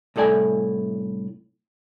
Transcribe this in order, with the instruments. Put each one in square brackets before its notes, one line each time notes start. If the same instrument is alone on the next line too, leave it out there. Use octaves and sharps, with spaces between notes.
[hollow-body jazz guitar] C2 A2 A4 D5 G#5